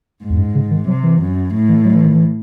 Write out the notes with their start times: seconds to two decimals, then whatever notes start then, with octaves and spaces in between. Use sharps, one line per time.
0.22 G#2
0.30 E2
0.38 F#2
0.55 C#3
0.71 D#3
0.87 C3 F#3
1.03 E3
1.20 F#2
1.53 A2
1.69 E3
1.85 F#3
1.95 E3
2.04 D#3
2.14 E3